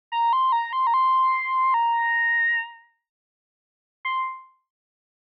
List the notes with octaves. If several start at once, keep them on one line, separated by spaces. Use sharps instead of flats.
A#5
C6
A#5
C6
A#5
C6
A#5
C6